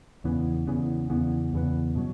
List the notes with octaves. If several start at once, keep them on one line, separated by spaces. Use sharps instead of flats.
E2 C#3 E3 B3
E2 C#3 E3 B3
E2 C#3 E3 B3
E2 C#3 E3 B3
B2 F#3